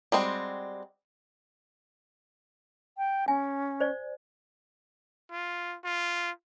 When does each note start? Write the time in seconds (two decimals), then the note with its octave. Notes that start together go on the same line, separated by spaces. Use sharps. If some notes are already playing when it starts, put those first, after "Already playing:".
0.12 G3 G#3 C4 F#4
2.98 G5
3.28 C#4 G#5
3.80 C5 D5
5.32 F4
5.84 F4